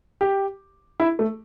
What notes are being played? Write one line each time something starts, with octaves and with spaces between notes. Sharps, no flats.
G4
E4
A3